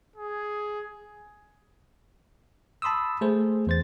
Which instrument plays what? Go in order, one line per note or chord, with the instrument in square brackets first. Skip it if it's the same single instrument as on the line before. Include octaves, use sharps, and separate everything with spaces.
[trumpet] G#4
[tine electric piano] A5 B5 C6 D#6 E6
A3 G#4 C5
E2 C5 A6